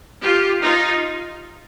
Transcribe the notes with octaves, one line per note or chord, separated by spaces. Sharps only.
F4 G4
D#4 F4